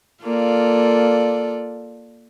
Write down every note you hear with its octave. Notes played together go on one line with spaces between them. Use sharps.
A#3 F4 A4 D5